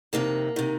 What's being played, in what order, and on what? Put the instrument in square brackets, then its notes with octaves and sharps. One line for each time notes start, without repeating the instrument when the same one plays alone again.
[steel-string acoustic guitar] F2 C3 D#3 A#3
C3 D#3